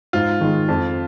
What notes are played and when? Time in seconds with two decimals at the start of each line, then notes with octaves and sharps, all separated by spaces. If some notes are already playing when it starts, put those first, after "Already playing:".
0.13 G#2 F4
0.41 D#3 G#3
0.68 F2